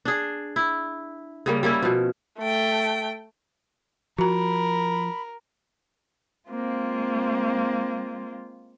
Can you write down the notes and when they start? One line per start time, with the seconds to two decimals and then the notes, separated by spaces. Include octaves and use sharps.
0.05 D4 G#4
0.56 E4
1.46 C#3 G3 A#3
1.63 G3 A#3 C#4 E4
1.82 B2 F3
2.39 A3 G5
4.19 F3 F#4 A#4 A#5 B5
6.50 G#3 A#3 C4 F4